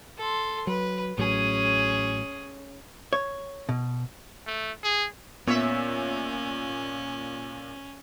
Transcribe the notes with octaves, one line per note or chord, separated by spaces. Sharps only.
A4 C6
F#3 B4
A1 A2 F#3 C#4 G#4
C#5
B2
A3
G#4
A#2 B3 C#4 C#5 E5